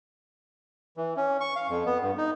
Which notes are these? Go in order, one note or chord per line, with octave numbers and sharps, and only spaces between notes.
E3
C#4
C#6
F5
F2
B3
G2
D#4